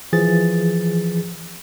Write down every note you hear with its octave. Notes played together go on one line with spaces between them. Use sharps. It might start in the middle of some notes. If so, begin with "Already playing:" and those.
E3 F3 G#4 A6